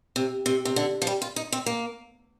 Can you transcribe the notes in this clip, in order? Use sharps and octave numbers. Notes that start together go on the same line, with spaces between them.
C3
C3
C3
D3
F3
G3
F4
D#4
C4
A#3